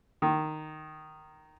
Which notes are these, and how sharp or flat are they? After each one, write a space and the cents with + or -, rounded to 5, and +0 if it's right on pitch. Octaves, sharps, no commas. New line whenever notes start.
D#3 -10